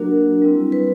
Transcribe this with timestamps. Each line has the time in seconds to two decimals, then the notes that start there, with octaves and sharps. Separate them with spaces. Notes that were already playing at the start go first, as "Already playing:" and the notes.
Already playing: F#3 A#3 D4 F#4 A#4
0.42 G3 C4 E4
0.72 B4